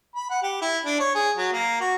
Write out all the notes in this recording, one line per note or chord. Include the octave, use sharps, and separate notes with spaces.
B5
F#5
G4
E4
D4
C#5
G#4
F#3
A#3
F#4